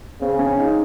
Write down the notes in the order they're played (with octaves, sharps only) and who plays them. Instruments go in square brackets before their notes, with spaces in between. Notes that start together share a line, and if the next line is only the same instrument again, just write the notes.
[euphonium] C#3 [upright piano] C4
[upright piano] C#4
D#4